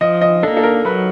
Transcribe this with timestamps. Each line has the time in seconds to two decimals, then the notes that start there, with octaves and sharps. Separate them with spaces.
0.01 F3 D#5
0.21 D#5
0.43 A#3 D4 A4
0.57 A4
0.63 A#4
0.85 F#3 B4